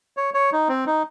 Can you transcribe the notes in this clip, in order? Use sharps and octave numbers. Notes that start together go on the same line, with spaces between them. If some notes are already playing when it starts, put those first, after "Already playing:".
C#5
C#5
D#4
C4
D#4